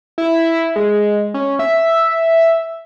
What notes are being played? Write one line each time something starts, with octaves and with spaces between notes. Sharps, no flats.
E4
G#3
C#4
E5